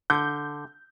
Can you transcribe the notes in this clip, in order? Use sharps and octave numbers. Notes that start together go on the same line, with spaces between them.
D3 G6